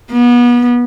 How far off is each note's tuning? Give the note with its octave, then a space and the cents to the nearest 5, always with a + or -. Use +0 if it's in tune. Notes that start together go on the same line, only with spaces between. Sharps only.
B3 -30